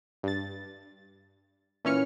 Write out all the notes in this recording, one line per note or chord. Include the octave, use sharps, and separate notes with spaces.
G2 A6
A#2 E3 C#4 F6 C#7